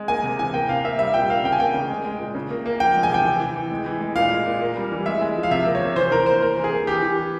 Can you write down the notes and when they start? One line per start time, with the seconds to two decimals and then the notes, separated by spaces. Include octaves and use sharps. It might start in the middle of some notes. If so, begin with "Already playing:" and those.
Already playing: G#3
0.08 A#3 G#5
0.23 C3
0.39 E3 G#5
0.54 A#3 G5
0.69 C3 F5
0.84 A#3 E5
0.99 G3 E5
1.14 A#2 G5
1.29 A#3 F5
1.44 C#3 G5
1.52 G#5
1.60 A#3 G5
1.74 C#3
1.89 G#3
2.05 G#3
2.19 A#2
2.35 C#3
2.51 A#3
2.66 A#3
2.80 F3 G5
2.95 G#3
3.03 G#5
3.10 C3 G5
3.25 E3
3.40 E3
3.56 E3
3.71 G#3
3.86 E3
4.01 G#3
4.15 A#2 F5
4.31 G#3
4.46 A#2
4.61 A#3
4.76 G3
4.92 E3
5.06 G#3 E5
5.21 G#3
5.36 F3
5.43 F5
5.51 C3 E5
5.66 A#3
5.75 C#5
5.82 C3
5.96 E3 C5
6.11 E3 A#4
6.26 A#3 C5
6.41 A#3 A#4
6.57 E3
6.64 G#4
6.72 A#3
6.87 E3 G4
7.02 E3
7.17 E3